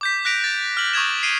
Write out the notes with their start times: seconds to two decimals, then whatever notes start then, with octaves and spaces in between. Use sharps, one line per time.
0.01 D6 G6 B6
0.25 F#6 A#6 B6 D7 F7
0.44 A6
0.77 F6 F#7
0.93 C#6 D#6 G#6 E7
1.23 C7 D7 D#7 G7